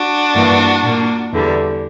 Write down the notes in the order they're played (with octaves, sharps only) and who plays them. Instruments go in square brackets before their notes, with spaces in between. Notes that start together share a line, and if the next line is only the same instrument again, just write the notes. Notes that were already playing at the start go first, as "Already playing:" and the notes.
Already playing: [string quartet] D4 F#4
G2 E3 A#3
A#2 A#3
E2 D3 G3